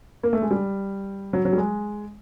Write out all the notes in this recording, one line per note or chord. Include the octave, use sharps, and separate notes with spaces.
A#3
A3
G#3
G3
F#3
F#3
G3
G#3